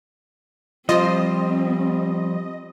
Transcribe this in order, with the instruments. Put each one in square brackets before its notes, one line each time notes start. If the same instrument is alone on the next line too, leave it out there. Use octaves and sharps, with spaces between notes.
[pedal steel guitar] F3 G3 [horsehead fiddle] C4 [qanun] F4 C5 C6 [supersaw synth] D#5